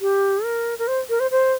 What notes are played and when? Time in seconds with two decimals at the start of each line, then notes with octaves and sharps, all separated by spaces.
0.01 G4
0.44 A#4
0.79 A#4
0.87 C5
1.09 A#4
1.20 C5
1.31 C5